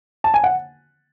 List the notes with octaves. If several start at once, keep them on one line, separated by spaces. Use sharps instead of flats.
A5
G#5
F#5